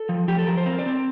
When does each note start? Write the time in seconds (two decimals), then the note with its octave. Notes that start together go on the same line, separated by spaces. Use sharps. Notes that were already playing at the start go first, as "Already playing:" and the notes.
Already playing: A4
0.09 F3
0.28 F3 G4
0.39 A4
0.47 F3 A#4
0.57 C5
0.66 C4 A#4
0.79 D5
0.86 C4